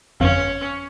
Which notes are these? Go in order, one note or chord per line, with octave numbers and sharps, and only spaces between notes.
G1 F2 C#4 F5